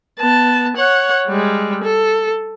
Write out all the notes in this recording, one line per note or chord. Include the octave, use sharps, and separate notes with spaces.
B3 A5
C#5 F#5
G3 G#3
A4